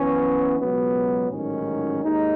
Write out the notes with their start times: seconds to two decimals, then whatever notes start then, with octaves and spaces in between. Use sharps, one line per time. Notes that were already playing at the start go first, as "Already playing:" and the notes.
Already playing: F#2 E3 B3 C#4
0.59 C#2 B2 F#3 B3
1.30 A1 G#2 D#3 F#3 C#4
2.03 D#2 D#3 G#3 D#4